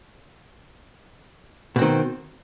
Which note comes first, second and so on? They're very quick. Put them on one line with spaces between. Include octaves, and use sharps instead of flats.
B2 C4 D#3